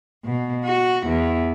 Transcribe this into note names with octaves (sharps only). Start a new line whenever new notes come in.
B2
F#4
E2